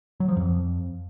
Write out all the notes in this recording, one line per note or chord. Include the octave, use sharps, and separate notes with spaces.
F#3
F3
F2